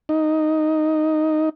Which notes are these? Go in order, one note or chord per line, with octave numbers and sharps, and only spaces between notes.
D#4